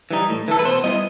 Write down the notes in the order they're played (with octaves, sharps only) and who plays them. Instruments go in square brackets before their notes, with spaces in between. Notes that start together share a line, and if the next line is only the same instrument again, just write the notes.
[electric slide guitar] E3 G3 D#4
A2
E3 A3 A4
B4
B2 C5
G3 B3 E4 D#5